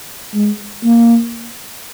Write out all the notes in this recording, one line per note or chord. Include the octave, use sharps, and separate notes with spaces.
G#3
A#3